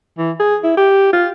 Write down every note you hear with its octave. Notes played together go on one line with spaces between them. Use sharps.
E3
G#4
E4
G4
F4